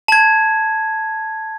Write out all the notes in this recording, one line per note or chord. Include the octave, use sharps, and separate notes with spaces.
A5 G#6